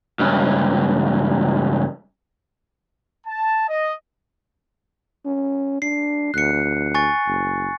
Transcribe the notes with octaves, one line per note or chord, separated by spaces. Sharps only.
C#2 G2
A5
D#5
C#4
D4 C7
D2 F#6 C#7
G#5 C#6 A6
F#1